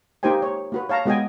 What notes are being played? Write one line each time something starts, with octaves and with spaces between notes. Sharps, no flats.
A#3 D#4 G4 C5 G5 G#5
C#5
A#3 F#4 B4
C#5 F5 A5 A#5
G#3 B3 F#4 D#5 G5 G#5